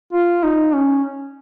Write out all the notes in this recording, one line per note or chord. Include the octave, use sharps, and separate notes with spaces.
F4
D#4
C#4